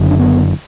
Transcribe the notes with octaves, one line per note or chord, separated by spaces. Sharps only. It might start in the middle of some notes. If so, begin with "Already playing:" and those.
Already playing: F#1 F#2 D3
D4
B3